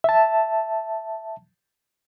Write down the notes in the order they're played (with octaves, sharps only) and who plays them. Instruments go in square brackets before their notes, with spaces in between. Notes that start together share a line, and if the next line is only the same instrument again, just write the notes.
[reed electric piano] E5 A5